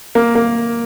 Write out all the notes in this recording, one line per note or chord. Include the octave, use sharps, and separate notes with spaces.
A#3
A#3